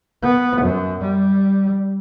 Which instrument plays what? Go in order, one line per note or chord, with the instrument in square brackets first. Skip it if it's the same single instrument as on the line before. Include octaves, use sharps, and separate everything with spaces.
[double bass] B3
F#2
G3